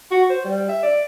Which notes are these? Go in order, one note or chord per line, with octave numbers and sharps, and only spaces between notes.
F#4
C5
G3
E5
D5